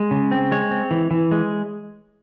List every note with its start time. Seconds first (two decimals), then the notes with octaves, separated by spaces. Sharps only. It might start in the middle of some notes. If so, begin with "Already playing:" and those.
Already playing: G#3
0.11 C#3
0.31 C4
0.52 G#3 C#5
0.71 C4
0.91 E3
1.11 E3
1.31 G#3